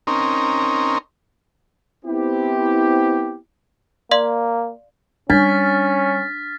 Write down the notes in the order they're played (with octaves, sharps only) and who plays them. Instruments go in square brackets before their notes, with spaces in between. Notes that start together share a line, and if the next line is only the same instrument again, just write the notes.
[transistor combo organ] C4 C#4 D#4 A#4
[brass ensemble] B3 C4 E4 G4
[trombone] A#3 [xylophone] D5 F5 C6
[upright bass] G3 [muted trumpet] C#4 [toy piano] D4 [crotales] F6 A6 B6